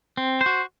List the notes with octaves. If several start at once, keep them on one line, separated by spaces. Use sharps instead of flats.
C4
C5
F#4